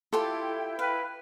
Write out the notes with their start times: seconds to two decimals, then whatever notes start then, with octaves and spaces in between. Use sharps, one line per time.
0.13 E4 F4 G4 A4 G5 C6
0.79 B4 F5